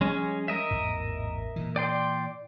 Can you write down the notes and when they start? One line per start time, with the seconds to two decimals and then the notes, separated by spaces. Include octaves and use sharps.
0.01 F3 G3 G#3 C#4
0.48 A#4 D#5 E5
0.71 A1 E2 G#2
1.56 A#2 E3
1.76 D5 G5 C6